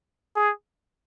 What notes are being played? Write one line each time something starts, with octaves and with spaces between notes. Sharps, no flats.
G#4